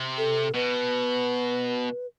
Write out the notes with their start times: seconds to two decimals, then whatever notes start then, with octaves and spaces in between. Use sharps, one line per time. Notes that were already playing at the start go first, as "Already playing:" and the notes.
Already playing: C3
0.18 A4
0.54 B2 B4